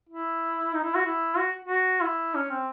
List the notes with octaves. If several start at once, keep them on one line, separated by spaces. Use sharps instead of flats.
E4
D#4
E4
F#4
E4
F#4
F#4
E4
C#4
C4